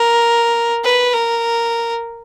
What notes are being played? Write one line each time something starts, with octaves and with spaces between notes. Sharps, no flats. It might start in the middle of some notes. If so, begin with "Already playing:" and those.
Already playing: A#4
B4
A#4